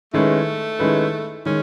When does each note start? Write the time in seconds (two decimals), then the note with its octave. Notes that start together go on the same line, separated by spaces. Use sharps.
0.13 D#3 G#3 A3 C#4 E4 B4
0.79 D#3 G#3 C#4 E4 B4
1.46 D#3 G#3 C#4